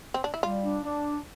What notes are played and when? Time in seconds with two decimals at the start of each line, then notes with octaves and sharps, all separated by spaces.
0.14 C4
0.24 D4
0.34 E4
0.43 G3 F4
0.64 D4
0.84 D4